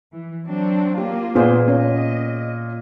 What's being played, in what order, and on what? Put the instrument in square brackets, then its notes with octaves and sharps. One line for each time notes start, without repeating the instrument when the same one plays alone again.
[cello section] E3
F#3 C4 D4
[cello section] A#3 F4 [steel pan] G4
[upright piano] A#2 [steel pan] B3 G#4 C5
[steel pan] C#4 [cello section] D#5